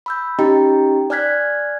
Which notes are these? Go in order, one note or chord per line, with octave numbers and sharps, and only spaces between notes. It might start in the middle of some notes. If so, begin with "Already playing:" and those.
B5 E6 G6
C#4 D#4 G4 D#5 G5 A#5
D5 G#5 F6 F#6 G#6 B6